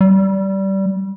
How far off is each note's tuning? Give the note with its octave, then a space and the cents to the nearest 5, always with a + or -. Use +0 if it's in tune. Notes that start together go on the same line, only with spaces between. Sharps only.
G3 -20